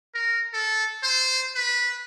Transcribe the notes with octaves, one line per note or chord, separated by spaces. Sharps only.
A#4
A4
C5
B4